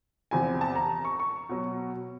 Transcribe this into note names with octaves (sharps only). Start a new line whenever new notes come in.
E2 C3 F3 G#5
A5
A#5
C#6
C#6
B2 F#3